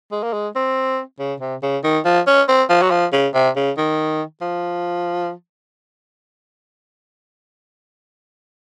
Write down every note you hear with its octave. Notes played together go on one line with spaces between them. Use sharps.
G#3
A#3
G#3
C4
C#3
C3
C#3
D#3
F3
C#4
C4
F3
F#3
F3
C#3
C3
C#3
D#3
F3